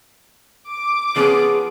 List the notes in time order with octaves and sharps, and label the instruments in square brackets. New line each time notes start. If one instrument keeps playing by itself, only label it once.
[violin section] D6
[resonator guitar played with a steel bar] F3 B3 C#4 [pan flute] G#4